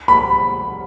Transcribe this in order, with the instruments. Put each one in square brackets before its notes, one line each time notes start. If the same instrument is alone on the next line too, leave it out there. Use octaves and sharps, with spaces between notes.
[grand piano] B5